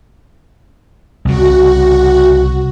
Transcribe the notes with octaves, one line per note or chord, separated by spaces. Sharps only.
C2 C#3 F#4